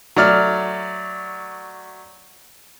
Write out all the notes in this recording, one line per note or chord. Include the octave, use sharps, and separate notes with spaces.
F#3 A3 D5 F6